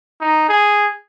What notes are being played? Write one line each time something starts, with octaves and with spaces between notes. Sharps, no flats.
D#4
G#4